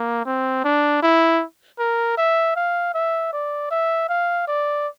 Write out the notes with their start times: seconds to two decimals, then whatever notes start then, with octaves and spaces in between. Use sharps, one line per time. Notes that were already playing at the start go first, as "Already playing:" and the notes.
Already playing: A#3
0.26 C4
0.64 D4
1.03 E4
1.79 A#4
2.18 E5
2.56 F5
2.94 E5
3.33 D5
3.71 E5
4.09 F5
4.48 D5